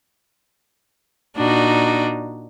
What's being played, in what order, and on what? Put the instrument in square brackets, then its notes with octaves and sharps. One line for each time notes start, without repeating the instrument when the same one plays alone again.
[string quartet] A#2 D4 D#4 F#4